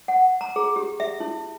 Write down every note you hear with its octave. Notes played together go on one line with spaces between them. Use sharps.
F#5
A#5
G#4
G4
E5
E4